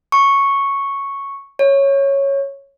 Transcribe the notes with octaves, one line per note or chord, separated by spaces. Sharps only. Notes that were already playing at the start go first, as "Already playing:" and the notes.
C#6
C#5